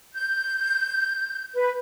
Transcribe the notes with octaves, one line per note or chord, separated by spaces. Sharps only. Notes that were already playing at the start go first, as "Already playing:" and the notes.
G6
B4